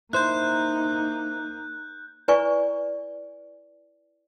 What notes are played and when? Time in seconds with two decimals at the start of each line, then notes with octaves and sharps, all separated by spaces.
0.13 A#3 D#4 E4 C5 F#6 G6
2.28 E4 B4 D5 G#5 C#6